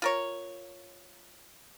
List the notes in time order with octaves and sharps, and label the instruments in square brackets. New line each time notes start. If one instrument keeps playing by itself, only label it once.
[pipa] F4 A#4 C#5